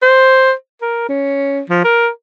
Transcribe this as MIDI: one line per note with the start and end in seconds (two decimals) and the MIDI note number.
0.02 0.53 72
0.82 1.07 70
1.09 1.61 61
1.70 1.80 53
1.84 2.09 70